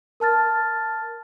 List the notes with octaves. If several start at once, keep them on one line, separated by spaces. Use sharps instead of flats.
A#4 A5 F6 A6